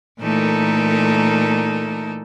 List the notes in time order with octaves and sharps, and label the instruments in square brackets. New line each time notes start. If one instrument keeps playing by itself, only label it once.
[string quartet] A#2 E3 A3 D#4 A4 A#4